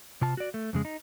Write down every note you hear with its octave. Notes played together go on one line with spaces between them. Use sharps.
C3 F4 A5
F#4 D5
A3
F2 C#3 G#3
D#4